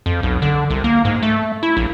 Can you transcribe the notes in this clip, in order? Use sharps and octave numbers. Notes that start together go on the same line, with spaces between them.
F2
B1
D3
C2
A#3
G#2
A3
E4
A#1